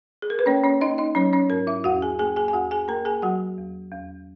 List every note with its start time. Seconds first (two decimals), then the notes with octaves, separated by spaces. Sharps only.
0.22 G#4
0.30 A#4
0.39 B4
0.46 A#3 C#4 C#5
0.64 C#4 C#5
0.81 A#3 D#4 D#5
0.98 D#4 D#5
1.15 F#3 C#4 C#5
1.33 C#4 C#5
1.50 G#2 A#4
1.67 E4 E5
1.84 E2 F#4 F#5
2.02 G#4 G#5
2.19 A#3 G#4 G#5
2.36 G#4 G#5
2.48 G#5
2.53 E2 F#4 F#5
2.71 G#4 G#5
2.88 A#3 A#4 A#5
3.05 G#4 G#5
3.22 F#3 F#4 F#5
3.58 E2
3.92 E2